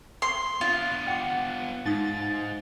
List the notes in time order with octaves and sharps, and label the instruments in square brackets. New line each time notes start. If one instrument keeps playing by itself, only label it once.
[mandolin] C6
[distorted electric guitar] B3 D4 [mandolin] F4
[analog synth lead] F#5 [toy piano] G5 D6
[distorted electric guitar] G#2 [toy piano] D#4 D#6 [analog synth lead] A6